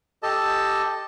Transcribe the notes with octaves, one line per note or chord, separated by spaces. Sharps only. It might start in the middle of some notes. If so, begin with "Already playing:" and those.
G4 A4 D#5 A5